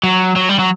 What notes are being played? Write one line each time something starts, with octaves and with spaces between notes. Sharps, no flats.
F#3
F#3
G3
F#3